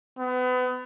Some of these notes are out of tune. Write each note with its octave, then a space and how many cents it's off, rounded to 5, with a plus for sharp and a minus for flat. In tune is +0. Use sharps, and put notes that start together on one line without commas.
B3 +30